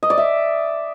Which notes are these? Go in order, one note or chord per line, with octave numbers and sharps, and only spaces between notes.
D#5
D5
E5